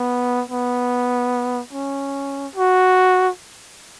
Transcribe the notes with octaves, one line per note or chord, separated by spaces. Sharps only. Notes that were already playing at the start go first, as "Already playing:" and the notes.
Already playing: B3
B3
C#4
F#4